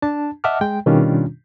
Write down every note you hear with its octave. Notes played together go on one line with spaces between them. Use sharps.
D4 A5
D#5 E5 F#5 A5 D6 F6
G#3 G5
B2 D#3 G3 C#4 D4 F4